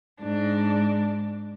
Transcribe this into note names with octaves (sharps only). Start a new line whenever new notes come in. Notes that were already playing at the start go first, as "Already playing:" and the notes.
G#2 D4